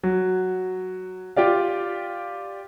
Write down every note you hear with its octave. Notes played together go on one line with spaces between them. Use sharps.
F#3
F4 G4 D5 F5